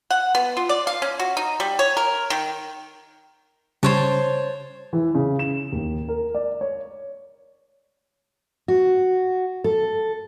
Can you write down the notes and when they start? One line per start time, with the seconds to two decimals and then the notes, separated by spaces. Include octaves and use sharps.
0.10 F#5
0.35 B3
0.57 F4
0.69 D5
0.87 F5
1.02 C#4
1.20 F#4
1.37 D#4
1.60 G3
1.79 C#5
1.97 A#4
2.30 D#3
3.83 C#3 G3 C5 C#5 A5
4.93 E3
5.15 C#3
5.39 E7
5.72 D#2
6.09 A#4
6.34 D5
6.61 C#5
8.68 F#4
9.64 A4